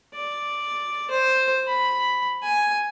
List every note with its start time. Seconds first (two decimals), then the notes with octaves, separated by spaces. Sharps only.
0.15 D5
1.11 C5
1.68 B5
2.44 G#5